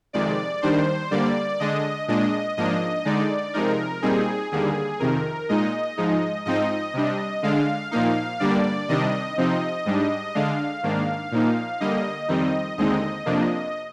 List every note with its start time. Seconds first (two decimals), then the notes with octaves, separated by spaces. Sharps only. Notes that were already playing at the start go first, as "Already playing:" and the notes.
0.13 F2 C3 D#3 G#3 D5
0.62 D#2 D#3 G3 D4 C5
1.11 D3 G3 A#3 D5
1.60 D3 G#3 D4 D#5
2.08 A#2 G#3 D4 D#5
2.57 G#2 F3 A#3 D4 D#5
3.05 D3 G#3 D#4 D5
3.53 C3 F3 G#3 D#4 A#4
4.02 A#2 G3 C4 D#4 G#4
4.51 D#2 D3 G3 A#3 G#4
5.00 F2 C3 D#3 A#4
5.49 A#2 G#3 D#4 D#5
5.97 G#2 F3 G#3 D#4
6.45 G#2 F3 C4 D#4 D#5
6.94 C3 G3 D4
7.42 D3 G#3 D4 F5
7.91 A#2 F3 A#3 D#4 F5
8.40 G2 D3 G3 A#3 D4 D5
8.89 C3 D#3 G3 D4 D#5
9.37 C3 F3 C4 D#4
9.85 G#2 G3 D4
10.35 D3 G#3 D4 F5
10.83 G#2 D#3 A#3 D4
11.32 A#2 F3 A#3 D#4
11.80 D3 G3 A#3 D#5
12.28 F2 D#3 G3 C4 D#4
12.78 D#2 D3 G#3 C4 D#4 D#5
13.26 F2 C3 F3 A#3 D4